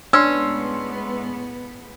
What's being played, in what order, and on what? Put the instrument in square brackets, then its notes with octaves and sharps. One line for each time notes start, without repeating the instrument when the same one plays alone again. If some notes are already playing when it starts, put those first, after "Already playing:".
[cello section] A2 G#3 B3 [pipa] C#4 [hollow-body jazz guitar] D4 [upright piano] C6 E6